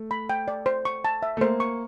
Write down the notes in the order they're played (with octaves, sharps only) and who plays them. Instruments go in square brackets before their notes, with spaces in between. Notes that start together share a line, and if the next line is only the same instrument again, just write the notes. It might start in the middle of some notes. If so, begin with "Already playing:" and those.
Already playing: [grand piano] A3
[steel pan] B5
G5
D5
C5
C#6
A5
E5
[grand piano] A3
[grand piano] A#3 [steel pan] C5
[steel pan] C#6